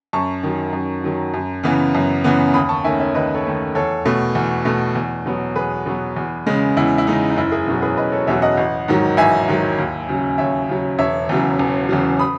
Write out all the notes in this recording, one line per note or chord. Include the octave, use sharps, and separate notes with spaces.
F#2 A5 C#6
D#3 F#3
F#2
D#3 F#3
F#2
C#3 E3 B3
F#2
C#3 E3 B3
D#2 B5 D#6
A5 C#6
D#3 A3 C#4 E5 G#5
C#5 E5
D#2 B4 D#5
A4 C#5
D#3 A3 C#4
E2 A4 C#5
B2 A3
E2
B2 A3
E2
B2 F#3 B3
E2 G#4 B4
B2 F#3 B3
E2
C#3 G#3
E2 E4
E4
C#3 G#3 D#4
D#4
F#1 E4
E4 G#4
E2 B2 F#3 C#4
G#4 B4
F#1 B4 D#5
A4 C#5
E2 B2 F#3 C#4 C#5 E5
D#5 F#5
A1
G#2 D#3 F#3
A1 E5 G#5
G#2 D#3 F#3
D#2
C#3 F#3
D#2 C#5 E5
C#3 F#3
E1 C#5 E5
E2 C#3 F#3
E1
E2 C#3 F#3
B5 D#6